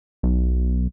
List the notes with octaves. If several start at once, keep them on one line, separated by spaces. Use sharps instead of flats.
B1